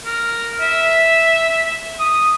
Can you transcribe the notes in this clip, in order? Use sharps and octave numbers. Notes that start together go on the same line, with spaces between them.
A#4
E5
D#6